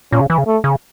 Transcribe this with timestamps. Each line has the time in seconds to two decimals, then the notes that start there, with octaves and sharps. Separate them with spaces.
0.12 A#2 C#4
0.21 C#3
0.30 E3
0.38 C#3
0.47 A3
0.64 C#3